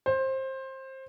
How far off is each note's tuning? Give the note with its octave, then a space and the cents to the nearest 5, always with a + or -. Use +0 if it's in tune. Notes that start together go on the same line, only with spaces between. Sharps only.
C5 +20